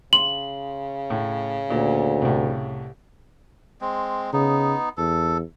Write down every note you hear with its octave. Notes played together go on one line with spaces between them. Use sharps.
C#3 C6 F#7
A2
D2 A#2
C2 A2
G#3 C4
C#3 B3 D#4
E2 A4